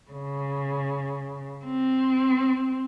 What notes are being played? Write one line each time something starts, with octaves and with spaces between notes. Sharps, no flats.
C#3
C4